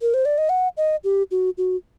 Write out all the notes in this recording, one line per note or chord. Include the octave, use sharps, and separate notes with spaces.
A#4
C5
D5
D#5
F#5
D#5
G4
F#4
F#4